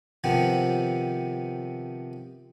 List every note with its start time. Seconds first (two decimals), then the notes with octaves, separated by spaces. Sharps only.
0.24 C3 D#3 F3 B3 C4